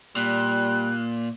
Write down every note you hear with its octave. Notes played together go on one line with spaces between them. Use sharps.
A#2 G3 F#6